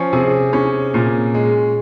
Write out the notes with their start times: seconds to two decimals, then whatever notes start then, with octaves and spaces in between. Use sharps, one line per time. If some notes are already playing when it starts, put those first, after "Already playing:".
Already playing: F3 C#4
0.13 C3 G#4
0.53 C#4
0.94 A#2
1.34 G#3